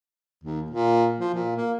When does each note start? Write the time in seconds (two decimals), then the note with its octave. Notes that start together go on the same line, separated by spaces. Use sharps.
0.44 D#2
0.70 A#2
1.20 F3
1.34 A#2
1.56 A#3